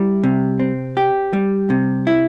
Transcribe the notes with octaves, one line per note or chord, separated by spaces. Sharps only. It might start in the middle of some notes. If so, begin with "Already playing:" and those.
Already playing: G3 E4
C3
C4
G4
G3
C3
E4